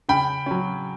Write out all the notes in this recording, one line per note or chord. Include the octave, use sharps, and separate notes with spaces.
C#3 G5 B5
F#3 C#4